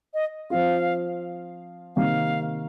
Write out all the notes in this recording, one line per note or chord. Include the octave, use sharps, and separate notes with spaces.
D#5
F3 C4 F4 F5
C3 D#3 A#3 F5